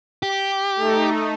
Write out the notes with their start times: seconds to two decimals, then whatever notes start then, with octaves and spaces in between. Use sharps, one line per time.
0.23 G4
0.76 A3 D#4